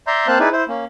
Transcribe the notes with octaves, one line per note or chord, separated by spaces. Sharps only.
D5 E5 A#5 C6 G6
A#3 C4 C5 F5 A5 F#6
D#4 E4 G#4 B4 D5
E4 C5
A#3 C#4